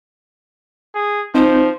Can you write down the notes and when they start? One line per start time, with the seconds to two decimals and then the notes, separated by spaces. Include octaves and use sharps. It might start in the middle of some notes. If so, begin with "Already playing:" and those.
0.95 G#4
1.35 F3 C4 D#4 C5